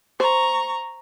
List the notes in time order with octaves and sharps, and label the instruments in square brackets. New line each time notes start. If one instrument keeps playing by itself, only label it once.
[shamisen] C5 [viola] A#5 C#6